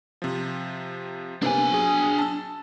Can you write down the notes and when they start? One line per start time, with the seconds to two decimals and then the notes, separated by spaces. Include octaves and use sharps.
0.22 C3 F3
1.42 C3 A#3 B3 D4 G#5
1.72 F#3 G#4
2.18 A5 E6